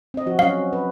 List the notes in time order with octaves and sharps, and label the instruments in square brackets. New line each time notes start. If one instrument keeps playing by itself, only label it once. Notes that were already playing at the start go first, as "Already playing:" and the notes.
[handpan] C4 D#5
F3 F#4
[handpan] F#3 C#4 [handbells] F5
[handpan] B4